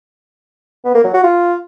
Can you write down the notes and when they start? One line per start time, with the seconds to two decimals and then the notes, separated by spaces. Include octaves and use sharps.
0.85 B3
0.94 A#3
1.04 F#3
1.14 F#4
1.23 F4